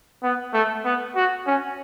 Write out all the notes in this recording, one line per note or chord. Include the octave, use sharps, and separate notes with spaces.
B3
A3
B3
F#4
C#4